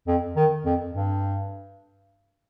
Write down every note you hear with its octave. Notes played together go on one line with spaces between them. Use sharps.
F2
D#3
F2
G2